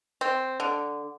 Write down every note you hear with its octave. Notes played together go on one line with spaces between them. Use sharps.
C4
D3